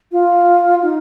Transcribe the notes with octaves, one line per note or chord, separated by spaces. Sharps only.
F4
D#4